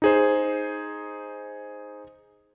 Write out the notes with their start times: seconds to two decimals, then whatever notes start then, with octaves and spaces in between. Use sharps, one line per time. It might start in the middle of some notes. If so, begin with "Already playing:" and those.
0.02 D#4 G#4 C5